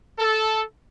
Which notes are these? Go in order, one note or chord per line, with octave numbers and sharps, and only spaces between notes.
A4